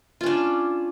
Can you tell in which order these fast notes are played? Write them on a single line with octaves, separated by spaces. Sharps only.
F4 C#4 D4